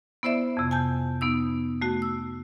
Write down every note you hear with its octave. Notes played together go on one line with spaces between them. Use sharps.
B3 E4 C5 D5 E5
F2 C3
G#5 A5 G6
B3 D#4 E6
A3 F#4
E6